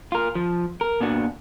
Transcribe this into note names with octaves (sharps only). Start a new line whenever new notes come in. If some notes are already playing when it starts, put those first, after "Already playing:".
F4 A#4
F3
A#4
A#2 B3 D4 F#4